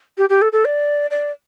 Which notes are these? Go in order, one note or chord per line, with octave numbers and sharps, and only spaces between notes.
G4
G4
A4
A4
D5
D5